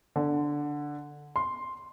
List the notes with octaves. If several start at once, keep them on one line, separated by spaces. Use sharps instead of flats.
D3
C6